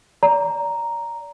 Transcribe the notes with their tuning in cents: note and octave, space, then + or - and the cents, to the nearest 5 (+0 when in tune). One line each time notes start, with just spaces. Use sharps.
D5 -30 A#5 +0